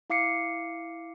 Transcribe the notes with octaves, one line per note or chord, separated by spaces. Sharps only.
E4 F5 D6 C7 C#7